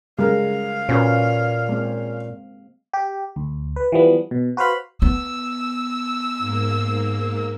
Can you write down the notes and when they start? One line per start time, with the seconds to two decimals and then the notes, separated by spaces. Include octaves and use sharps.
0.19 C#3 G3 G#3 A#4 F5
0.89 A#2 C#4 F#4 B4
1.69 G#3 A#3 C4
2.93 G4
3.36 D2
3.76 B4
3.92 E3 F3 G3 B3
4.31 B2
4.57 F#4 B4 C5 F5 B5
5.02 B3 E6
6.39 G#2 A#3